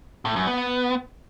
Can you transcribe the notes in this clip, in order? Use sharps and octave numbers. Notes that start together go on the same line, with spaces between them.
A2
F#2
B3